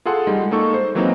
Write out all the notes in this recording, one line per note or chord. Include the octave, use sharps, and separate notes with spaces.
F4 G#4 A4 F#5 C6
G3 G#3 D#4
A#3 D#4 A4 C#6
C5
E3 F#3 A#3 C4 D#4